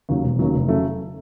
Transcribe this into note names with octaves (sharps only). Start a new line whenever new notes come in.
D#2 C#3 F#3
E1
D#2 C#3 F#3
F1
C#3 F#3 A3